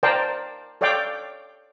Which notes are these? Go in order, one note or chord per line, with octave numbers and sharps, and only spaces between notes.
A#4 C5 D5 F5 G5 A5
A4 C#5 D5 F5 G5 D6